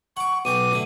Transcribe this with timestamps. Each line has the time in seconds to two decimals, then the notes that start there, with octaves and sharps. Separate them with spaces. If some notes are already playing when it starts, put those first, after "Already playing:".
0.17 F#5 C#6 D6
0.45 B1 F#4 G5 D6 D#7
0.71 A2 D3 E4